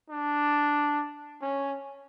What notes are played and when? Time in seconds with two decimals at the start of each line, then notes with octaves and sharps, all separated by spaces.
0.10 D4
1.42 C#4